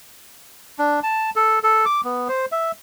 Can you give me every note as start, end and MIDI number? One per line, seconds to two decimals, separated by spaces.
0.79 1.00 62
1.03 1.30 81
1.36 1.59 69
1.63 1.85 69
1.85 2.01 86
2.04 2.28 59
2.29 2.46 72
2.52 2.72 76